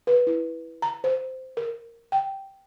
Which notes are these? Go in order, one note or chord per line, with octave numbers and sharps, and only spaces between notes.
B4
E4
A#5
C5
A#4
G5